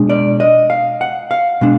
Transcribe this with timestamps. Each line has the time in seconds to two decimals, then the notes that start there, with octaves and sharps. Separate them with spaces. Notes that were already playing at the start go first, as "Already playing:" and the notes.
Already playing: B2 G#3 D4
0.09 D5
0.40 D#5
0.70 F5
1.01 F#5
1.31 F5
1.61 B2 G#3 D4